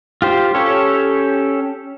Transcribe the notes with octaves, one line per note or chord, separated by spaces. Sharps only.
F4 G4 C5
C#4 G4 A4 C#5